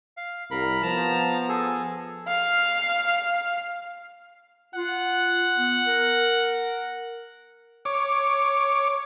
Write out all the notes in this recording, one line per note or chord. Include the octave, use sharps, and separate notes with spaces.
F5
C2 A#4 B5
F3 B3 A5 A#5
G#4 A4
F5
F4 F#5
B3
A#4
C#5 D6